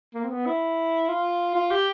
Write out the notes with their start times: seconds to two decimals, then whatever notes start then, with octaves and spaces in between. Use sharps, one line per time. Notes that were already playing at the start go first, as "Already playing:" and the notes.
0.14 A#3
0.24 C4
0.30 B3
0.46 E4
1.09 F4
1.56 F4
1.71 G4